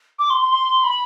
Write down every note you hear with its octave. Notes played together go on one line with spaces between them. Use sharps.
D6
C6
C6
C6
B5